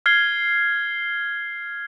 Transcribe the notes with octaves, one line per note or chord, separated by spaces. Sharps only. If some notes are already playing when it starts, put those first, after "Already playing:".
F6 G#6 C7 G7